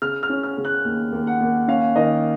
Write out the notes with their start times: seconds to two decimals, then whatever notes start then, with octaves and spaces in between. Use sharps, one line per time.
0.02 C#3 F6
0.23 F6
0.29 C#4
0.43 F6
0.57 C#3
0.65 F#6
0.84 D#2
1.12 D#2
1.27 F#5
1.41 D#2
1.68 C#4 F5
1.96 D#3 D#5